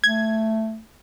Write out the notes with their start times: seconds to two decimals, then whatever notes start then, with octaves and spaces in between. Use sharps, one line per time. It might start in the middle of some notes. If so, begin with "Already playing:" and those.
0.04 A3 G#6